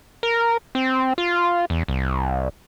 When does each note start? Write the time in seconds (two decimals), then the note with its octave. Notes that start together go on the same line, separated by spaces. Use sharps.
0.23 A#4
0.75 C4
1.18 F4
1.70 E2
1.88 C2